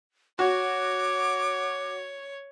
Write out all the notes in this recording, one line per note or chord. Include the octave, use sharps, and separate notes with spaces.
F#4 C#5 D6